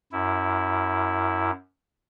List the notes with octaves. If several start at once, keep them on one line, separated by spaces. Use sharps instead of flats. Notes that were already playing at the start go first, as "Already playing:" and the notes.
F#2 E4